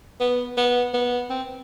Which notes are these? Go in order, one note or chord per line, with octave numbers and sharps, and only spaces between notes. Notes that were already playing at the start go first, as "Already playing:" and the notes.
B3
B3
B3
C4